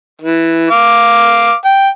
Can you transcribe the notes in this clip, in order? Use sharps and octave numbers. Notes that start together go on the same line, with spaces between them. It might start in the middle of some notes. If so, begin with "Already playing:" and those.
E3
F5 D6
G5